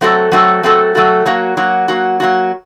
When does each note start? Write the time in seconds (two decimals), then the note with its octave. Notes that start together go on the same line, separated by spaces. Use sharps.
0.01 F#3 A3 C4 F#4 A4
0.32 F#3 A3 C4 F#4 A4
0.63 F#3 A3 C4 F#4 A4
0.95 F#3 A3 C4 F#4 A4
1.26 F#3 A#3 F#4
1.57 F#3 A#3 F#4
1.88 F#3 A#3 F#4
2.20 F#3 A#3 F#4